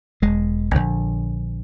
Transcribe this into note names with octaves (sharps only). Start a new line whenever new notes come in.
E1 G#3
A#1 D3